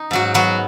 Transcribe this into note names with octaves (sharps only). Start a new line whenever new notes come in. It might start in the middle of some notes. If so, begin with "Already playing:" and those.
Already playing: D#4
G#2 F#3 F#4
F#3 B3 F#4